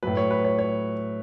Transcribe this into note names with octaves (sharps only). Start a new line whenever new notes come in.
A2 F#3 B4
C#5
B4
C#5
C#5